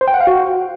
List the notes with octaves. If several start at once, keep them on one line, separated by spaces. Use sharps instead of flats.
C5
G5
F#5
F5
F#4